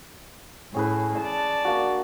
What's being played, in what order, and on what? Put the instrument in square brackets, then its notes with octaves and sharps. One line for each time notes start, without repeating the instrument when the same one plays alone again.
[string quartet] A2 [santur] C#4 G#4 B4
[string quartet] D5 A5
[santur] A#3 D4 F#4